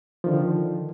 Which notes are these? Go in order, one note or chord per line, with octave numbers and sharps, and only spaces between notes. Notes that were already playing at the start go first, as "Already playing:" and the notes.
D3 D#3 F3